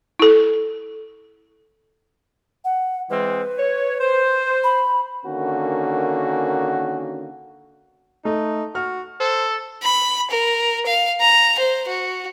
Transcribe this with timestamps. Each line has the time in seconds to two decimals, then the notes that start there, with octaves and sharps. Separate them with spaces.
0.19 E4 A4
2.65 F#5
3.10 E3 G#3 C4 B4
3.58 C#5
4.01 C5
4.64 B5
5.25 D3 D#3 A#3 C#4 F#4
8.25 A3 D#4
8.75 F#4 F6
9.20 A4 C5
9.83 B5
10.30 A#4
10.86 F5
11.21 A#5
11.59 C5
11.88 F#4